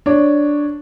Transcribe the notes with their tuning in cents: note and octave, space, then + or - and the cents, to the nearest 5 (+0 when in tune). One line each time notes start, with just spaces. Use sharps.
D4 +0 C#5 +0